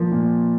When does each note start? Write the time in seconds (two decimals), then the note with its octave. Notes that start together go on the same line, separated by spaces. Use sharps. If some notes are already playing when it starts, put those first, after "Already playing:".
Already playing: A#2 F3 A#3
0.11 A#2